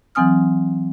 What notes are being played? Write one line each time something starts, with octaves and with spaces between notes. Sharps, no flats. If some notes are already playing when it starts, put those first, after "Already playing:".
E3 F#3 C4 G#5 D#6 F6